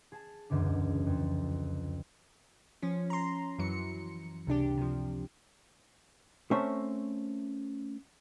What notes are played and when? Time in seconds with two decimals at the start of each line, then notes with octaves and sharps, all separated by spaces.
0.12 G#4 A5
0.50 E1 C#2 F#2 D3 D4
1.06 F2
2.82 F3 C#4
3.10 A#5 C6
3.59 F#2 E3 F#3 C#7
4.47 C#2 C3 D4 G4
4.78 C3 F3
6.51 A3 C4 C#4 A#4 C5 E5